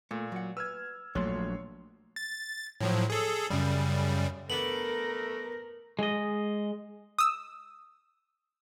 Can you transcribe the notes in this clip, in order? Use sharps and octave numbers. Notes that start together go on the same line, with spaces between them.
A#2 A3
F#3 F#5
B4 E6 F6 G#6
A#1 F#3 A3 D4 C#5 C6
A6
A2 F3 F#3
G#4 A4
F#2 C#3 G3
A3 B3 D4 A#4 F#7
G#3 D#5
D#6 E6